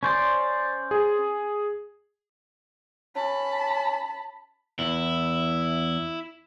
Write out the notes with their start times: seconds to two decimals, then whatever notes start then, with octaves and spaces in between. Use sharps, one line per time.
0.03 C#4 C5 D5 C#6
0.91 G#4
3.16 C#4 A5 B5
4.79 E2 E4